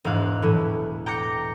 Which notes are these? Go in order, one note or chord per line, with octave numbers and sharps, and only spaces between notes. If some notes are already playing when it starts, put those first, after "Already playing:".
E1 G#2 E4 F5 F#6
A2 E3 A3
G5 A#5 D6 G6 A#6 C#7